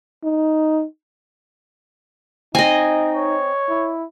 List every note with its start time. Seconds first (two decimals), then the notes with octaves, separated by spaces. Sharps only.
0.24 D#4
2.55 C4 D#4 D#5 G#5
3.14 C#5
3.69 E4